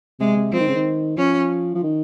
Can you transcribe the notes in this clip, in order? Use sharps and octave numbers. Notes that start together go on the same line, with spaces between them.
C3 G#3
C3
F3 C4
D#3
C#3
D#3
F3 C#4
F3
D#3